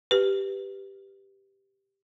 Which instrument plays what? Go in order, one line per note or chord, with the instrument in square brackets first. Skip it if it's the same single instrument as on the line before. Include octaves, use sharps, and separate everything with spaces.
[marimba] G4 B4